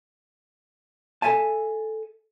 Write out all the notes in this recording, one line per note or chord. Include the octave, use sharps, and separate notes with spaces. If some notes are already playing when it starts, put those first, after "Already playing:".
A4 A#4 E5 G#5 A5